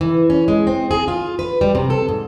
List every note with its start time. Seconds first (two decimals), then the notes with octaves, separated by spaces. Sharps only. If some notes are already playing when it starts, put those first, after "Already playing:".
0.01 E3
0.30 C#4
0.48 G#3
0.67 C4
0.91 G#4
1.08 F4
1.39 B4
1.61 G3
1.75 C3
1.90 A4
2.08 G#2